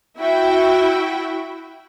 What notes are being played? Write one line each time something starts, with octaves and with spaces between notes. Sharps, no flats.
E4 F#4 E5 G5